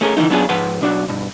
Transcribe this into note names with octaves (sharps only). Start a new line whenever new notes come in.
A3 C#4 G#4 A#4
D3 E3 F#3 A3 D#4
F#3 B3 C#4 D4 F4 G#4
G#2 F3 B4 F#5 C6
B1 D4 F#4
G2 B2